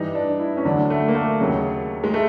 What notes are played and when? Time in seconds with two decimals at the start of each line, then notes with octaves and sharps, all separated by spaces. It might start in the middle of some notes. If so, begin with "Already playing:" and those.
Already playing: G2 E3 G3 D#4
0.15 D4
0.40 E4
0.57 C#4
0.64 D2 D3 F#3 D4
0.90 A3
1.08 A#3
1.15 A3
1.40 D#2 C#3 F#3
2.04 G#3
2.14 A3